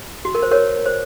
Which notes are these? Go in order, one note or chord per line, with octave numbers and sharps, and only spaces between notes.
F#4
A#4
C5
A#4 C#5
C5